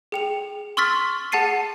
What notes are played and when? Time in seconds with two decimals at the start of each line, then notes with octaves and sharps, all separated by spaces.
0.12 G#4 G5 F7
0.77 C6 C#6 E6 F6 A6 B6
1.32 G#4 F#5 A5 A6 C7 D#7